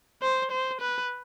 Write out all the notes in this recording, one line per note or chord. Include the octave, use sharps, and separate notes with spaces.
C5
C5
B4